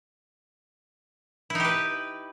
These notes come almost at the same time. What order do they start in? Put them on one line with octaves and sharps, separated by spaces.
E4 D#4 G4 B4